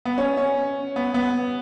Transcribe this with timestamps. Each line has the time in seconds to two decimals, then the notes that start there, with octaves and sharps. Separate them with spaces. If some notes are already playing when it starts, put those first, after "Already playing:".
0.05 B3
0.18 C#4
0.37 C#4
0.96 B3
1.14 B3